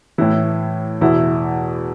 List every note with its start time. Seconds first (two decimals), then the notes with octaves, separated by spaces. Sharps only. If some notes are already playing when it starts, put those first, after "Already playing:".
0.18 A2 E3 E4
1.01 E2 B2 E4